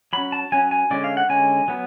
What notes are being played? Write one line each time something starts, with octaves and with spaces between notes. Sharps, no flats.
F#3 C#4 B5
A5
F#3 C#4 G#5
G#5
D3 G#3 C#4 D5
F5
F#5
D3 G#3 C#4 G#5
F#3 B3